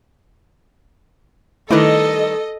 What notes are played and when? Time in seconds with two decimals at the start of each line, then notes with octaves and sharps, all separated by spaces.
1.71 D#3 G3 A3 E4 A4 B4 D#5